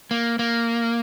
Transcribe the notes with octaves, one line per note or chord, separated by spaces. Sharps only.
A#3
A#3